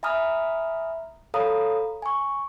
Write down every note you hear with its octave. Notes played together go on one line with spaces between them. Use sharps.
E5 G#5 A#5 B5 D#6 F6
A4 C#5 F5 A#5 B5 D#6
G#5 C#6